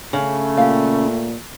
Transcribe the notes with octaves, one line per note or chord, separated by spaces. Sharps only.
C#3 A3
A#2 G4 F5